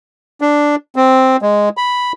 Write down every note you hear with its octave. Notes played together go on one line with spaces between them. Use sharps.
D4
C4
G#3
B5